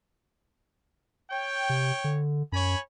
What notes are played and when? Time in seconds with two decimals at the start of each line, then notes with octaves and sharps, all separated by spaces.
1.30 C#5 G5
1.69 C3
2.04 D3
2.52 F#2 C#5 G#5 B5